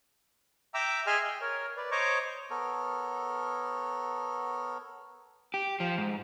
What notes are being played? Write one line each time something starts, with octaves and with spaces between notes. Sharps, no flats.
E5 G5 A#5 D6 E6
G#4 D#5 E5 G#5 C6 F6
G5
A#4 C#5
B4 D5
C5 C#5 D#5 A#5 C#6 D6
B3 A4 A#4 C#5
G4
F3
G#2